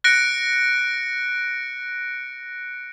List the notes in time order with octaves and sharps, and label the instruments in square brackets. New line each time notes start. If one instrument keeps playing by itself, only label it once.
[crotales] F#6 A#6 C#7 D7